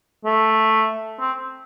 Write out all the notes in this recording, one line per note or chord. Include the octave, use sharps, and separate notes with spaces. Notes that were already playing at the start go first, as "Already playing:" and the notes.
A3
C4